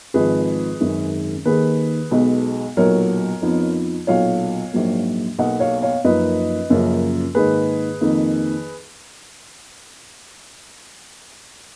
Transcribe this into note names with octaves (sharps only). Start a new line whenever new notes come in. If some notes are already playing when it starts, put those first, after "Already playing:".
G#1 G#2 F3 G#3 G#4 B4
G#1 F#2 D#3 G#3
D#2 D#3 A#3 G#4 B4
B1 B2 G#3 B3
B1 A#2 F#3 A#4 C#5
F2 F3 B3 D#4
B1 A#2 F#3 C#5 F5
A#1 G#2 F#3 A#3
B1 B2 A#3 D#5 F#5
C#5 F5
C#5 F5
F#2 F3 A#3 D#4 B4 D#5
F#2 C#3 F3 A#3 C#4
G#2 D#3 A#3 G#4 B4
F2 D#3 A#3 D#4